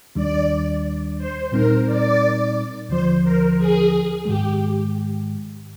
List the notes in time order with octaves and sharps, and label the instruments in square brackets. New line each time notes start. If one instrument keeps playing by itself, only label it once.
[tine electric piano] D#2 D#3 G3 D4 [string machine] D5
[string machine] C5
[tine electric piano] A#2 G3 C4 D#4 [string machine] A#4
[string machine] D5
[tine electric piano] D#2 D3 F3 [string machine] C5
[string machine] A#4
G#4
[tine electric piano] G#2 D#3 G#3 [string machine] G4